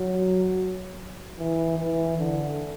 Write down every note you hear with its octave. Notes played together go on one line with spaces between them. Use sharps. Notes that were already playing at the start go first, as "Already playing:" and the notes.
Already playing: F#3
E3
E3
D3